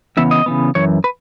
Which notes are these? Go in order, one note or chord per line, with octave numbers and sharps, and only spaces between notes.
C#3 E3 B3 E5
D#5
C#3 E3 B3
F#2 E3 C#5
B4